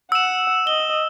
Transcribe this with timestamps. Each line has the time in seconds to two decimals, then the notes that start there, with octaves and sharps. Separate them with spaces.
0.12 F#5 E6 E7
0.67 D#5 G7